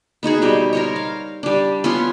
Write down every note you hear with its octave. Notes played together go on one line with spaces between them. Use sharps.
B3 D#4 F#4 G#4
B2 G3
A#4 C5 C#5
F5
G3 D4
B3 C#4 F4 C6